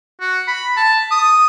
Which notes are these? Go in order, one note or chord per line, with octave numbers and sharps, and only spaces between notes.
F#4
B5
A5
D#6